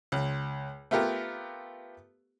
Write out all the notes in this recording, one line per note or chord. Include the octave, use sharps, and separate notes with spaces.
C#2
A3 B3 F4 G4 A#4